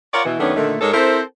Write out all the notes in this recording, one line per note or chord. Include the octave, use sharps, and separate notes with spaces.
F4 A#4 C#5 D5 F5 F#5
B2 E3
F#2 D#3 A3 B3 C#4 D4
A#2 D3 D#3 A3
G#2 G#3 D#4 A4 A#4 C#5
C4 E4 A4 A#4 C5